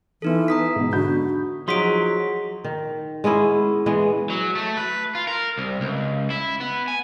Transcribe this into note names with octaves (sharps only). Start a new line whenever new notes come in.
E3 B3 D#4 A4
A#5 D#6 B6
G#2 B2
D3 F#4 B5 G6
F3 F#3 D#4 F4 G#4 C6 B6 D7
D#3
G#3 B3 C#4 E4
E3 G#3 B3
F#3
A3
B4
F4
A#4
C2
C#2
E4
B3
G#5